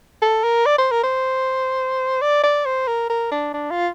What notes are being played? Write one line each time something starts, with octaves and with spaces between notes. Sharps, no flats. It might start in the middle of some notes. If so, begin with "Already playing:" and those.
A4
A#4
D5
C5
A#4
C5
D5
D5
C5
A#4
A#4
D4
D4
F4